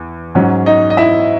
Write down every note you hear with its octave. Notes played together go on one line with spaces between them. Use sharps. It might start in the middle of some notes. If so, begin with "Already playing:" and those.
Already playing: E2
G#2 F#3 C#4 C#5
D#4 D#5
D#5
E4 E5